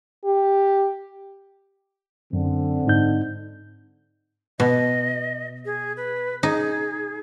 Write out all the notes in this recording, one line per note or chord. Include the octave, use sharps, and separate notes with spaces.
G4
F#2 D3 C4
G#2 D#4 G6
B2 D#5
G#4
B4
D#4 G#4